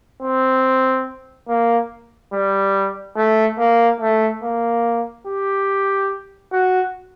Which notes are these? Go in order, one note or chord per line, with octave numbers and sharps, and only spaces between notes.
C4
A#3
G3
A3
A#3
A3
A#3
G4
F#4